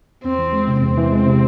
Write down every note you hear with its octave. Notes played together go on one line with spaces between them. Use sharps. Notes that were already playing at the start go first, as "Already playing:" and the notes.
E2 C4
E3
G#3
C3
E2 C4
E3
G#3
C3